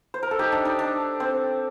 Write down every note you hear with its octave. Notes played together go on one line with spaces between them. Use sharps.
C5
A#4
A4
D#4 G4
D4
D#4
D4
C4